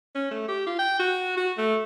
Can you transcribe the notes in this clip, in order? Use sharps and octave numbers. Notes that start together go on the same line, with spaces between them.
C#4
A3
G4
F4
G5
F#4
F#4
A3